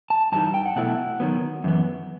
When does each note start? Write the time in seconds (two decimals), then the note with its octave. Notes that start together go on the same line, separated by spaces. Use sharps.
0.10 A5
0.32 G2 E3 G3 D#4 A5
0.54 G5
0.66 F#5
0.76 B2 F#3 A3 E4 F#5
1.20 D#3 F#3 B3
1.64 F#2 E3 B3